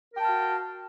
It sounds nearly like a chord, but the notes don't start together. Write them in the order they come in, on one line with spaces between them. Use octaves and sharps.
A#4 G5 A5 F5 F#4